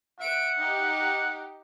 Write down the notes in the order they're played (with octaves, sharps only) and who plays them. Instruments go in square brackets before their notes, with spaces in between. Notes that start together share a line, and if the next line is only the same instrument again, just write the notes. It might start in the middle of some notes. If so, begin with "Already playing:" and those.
[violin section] E5 D7 [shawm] F#5
[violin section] D#4 G4